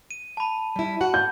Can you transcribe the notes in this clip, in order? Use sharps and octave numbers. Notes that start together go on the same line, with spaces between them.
D#7
A5 B5
G3 E4
F#4 F#5
G6